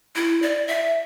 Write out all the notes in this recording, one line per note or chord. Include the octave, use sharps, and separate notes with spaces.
E4
D5
E5